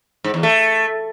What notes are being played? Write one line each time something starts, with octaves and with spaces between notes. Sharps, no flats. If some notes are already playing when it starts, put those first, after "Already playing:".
G#2
E2
A3